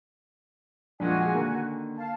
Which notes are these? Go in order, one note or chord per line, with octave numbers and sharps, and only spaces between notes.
F2 A#2 G#3 D4 F#4 G#5
G#4 F#5
D3 D#3 A#3
F5 A5